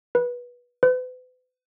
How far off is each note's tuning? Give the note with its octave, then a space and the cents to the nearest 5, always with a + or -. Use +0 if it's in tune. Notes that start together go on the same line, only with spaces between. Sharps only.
B4 -20
B4 +40